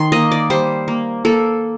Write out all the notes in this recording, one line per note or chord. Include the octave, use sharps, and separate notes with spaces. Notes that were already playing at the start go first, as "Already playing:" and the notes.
Already playing: D#3 C6
A#3 D#5
D5
G3 C5
A#3
A#3 A4